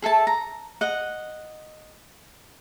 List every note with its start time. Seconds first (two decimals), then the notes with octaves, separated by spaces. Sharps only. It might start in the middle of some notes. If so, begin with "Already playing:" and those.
0.02 G#4 A4 E5 A5
0.27 A#5
0.81 D#5 F#5